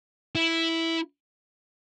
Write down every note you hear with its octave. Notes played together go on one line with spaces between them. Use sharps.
E4